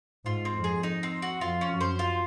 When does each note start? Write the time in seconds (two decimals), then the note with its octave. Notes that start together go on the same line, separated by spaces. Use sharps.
0.25 G#2 F4
0.45 C4
0.55 F2
0.64 G#4
0.83 D#4
1.03 C4
1.22 F#4
1.41 F2 F4
1.61 C#4
1.70 F#2
1.80 C5
1.99 F4